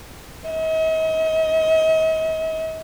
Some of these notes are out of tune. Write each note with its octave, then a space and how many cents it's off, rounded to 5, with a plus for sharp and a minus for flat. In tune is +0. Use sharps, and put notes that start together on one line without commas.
D#5 +45